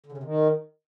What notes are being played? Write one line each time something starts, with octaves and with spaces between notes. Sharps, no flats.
D3
C#3
C3
D#3